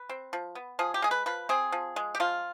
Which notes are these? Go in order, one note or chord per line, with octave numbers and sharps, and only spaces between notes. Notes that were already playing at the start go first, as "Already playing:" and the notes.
Already playing: B4
C4
F3
B3
F3 G#4
G4
G#3 G#4
B4
F3 B4
C4 G#4
F3
G#3
G4
F3 F4